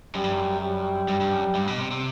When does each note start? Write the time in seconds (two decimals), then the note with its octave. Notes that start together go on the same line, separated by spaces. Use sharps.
0.15 F#2 G3
0.24 G2
0.32 F#2
0.61 G3
1.08 G2
1.20 G2
1.32 F#2
1.55 G2
1.68 B2
1.79 C3
1.91 C3